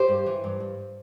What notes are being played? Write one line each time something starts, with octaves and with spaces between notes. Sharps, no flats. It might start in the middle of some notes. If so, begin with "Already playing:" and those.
Already playing: G4 C5
G2
E3
G2
G2